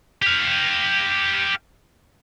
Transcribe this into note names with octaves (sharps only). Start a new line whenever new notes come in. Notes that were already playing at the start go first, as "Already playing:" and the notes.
G4 F5